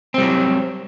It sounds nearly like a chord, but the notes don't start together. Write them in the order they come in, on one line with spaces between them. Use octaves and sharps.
C4 G3 F#3